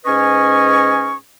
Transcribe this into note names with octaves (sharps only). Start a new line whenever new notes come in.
G#2 C#4 B4 D#5 G#5 C#6